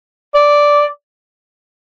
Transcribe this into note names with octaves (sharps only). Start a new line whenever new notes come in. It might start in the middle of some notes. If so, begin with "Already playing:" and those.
D5